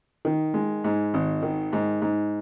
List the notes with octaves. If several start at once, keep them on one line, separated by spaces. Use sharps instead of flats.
D#3
G#3
G#2
G#1
D#3
G#2
G#2